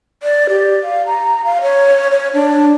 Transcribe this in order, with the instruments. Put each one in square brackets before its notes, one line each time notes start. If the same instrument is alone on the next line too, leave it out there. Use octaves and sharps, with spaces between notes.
[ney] D5
G4
F5
A#5
F5
C#5
C#5
D4